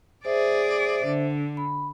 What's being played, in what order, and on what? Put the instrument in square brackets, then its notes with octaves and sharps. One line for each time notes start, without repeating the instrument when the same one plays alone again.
[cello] G#4 D5 [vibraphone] C5 E5
[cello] D3
[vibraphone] B5